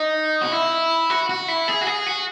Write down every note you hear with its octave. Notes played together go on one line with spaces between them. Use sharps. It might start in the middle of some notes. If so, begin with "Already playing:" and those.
Already playing: D#4
F#4
E4
F#4
F#4
E4
G#4
F#4
G#4
F#4